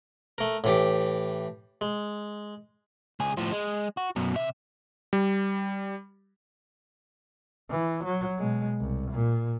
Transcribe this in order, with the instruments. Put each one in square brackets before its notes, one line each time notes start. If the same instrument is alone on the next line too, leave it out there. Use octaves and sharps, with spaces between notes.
[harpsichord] A3 A#4
A2 E3 G4
G#3
[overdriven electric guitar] C#2 G#4
A2 F3
G#3
F#4
F#2 B2
C3 E5
[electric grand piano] G3
[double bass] E3
F#3
B2 G#3
C2
A#2